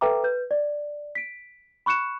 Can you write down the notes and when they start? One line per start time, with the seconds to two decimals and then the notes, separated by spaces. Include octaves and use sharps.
0.01 A4 B4 E5 G5 A#5 D6
0.24 B4 G6
0.51 D5
1.15 B6 D7
1.86 B5 C#6 F#6 C#7 E7